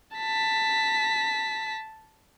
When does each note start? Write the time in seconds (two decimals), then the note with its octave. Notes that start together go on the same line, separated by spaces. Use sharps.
0.17 A5 B6